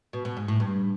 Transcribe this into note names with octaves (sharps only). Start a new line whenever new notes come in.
B2
B2
G#2
A2
G2